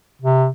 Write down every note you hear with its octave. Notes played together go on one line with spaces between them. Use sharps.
C3